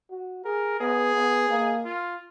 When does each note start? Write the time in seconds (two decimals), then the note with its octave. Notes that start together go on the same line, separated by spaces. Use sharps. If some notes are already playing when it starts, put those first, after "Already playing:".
0.10 F#4
0.45 G#4 A#4
0.80 B3 G#4
1.14 B3
1.49 A#3
1.85 F4